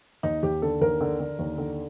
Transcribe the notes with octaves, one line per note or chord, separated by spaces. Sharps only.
D#2 D#4
D#2 G4
D3 A4
D#2 A#4
D3
D3
D#2
D3